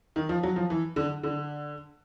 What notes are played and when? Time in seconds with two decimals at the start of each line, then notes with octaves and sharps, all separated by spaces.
0.16 D#3
0.29 F3
0.43 F#3
0.56 F3
0.70 E3
0.96 D3
1.23 D3